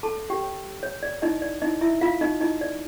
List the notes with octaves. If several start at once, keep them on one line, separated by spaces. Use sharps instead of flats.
A4 A5
G4 G5
C#5
C#5
D5
D#4 E4 D#5
D5
D#4 E4 D#5
E4 E5
E4 F4 F5
D#4 D#5
D#4 E4 D#5
D5